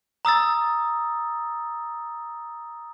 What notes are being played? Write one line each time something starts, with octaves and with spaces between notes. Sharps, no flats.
A#5 D#6 E6 A6